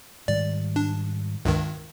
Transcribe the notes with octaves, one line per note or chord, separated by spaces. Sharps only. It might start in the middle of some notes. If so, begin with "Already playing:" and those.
G#2 D#3 G3 D5
D4
C#2 G2 D#3